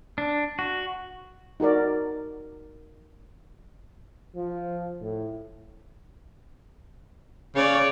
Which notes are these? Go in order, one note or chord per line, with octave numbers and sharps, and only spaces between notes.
D4
F#4
D#4 F#4 A#4 D5
F3
A2
C#3 C#5 D5